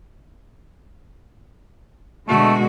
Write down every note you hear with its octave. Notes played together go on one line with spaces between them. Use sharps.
B2 D3 G#3 A3 F#4